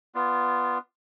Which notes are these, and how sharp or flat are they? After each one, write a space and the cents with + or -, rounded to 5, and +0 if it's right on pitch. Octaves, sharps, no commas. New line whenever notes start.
B3 +0 F4 -10 D5 +0